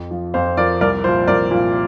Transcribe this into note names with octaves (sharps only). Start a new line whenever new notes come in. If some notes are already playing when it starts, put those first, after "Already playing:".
Already playing: F2
F3
F2 C5 F5
F3 A#4 D5
C2 A#4 D5
A#2 F3 C5
C2 A#4 D5
A#2 F3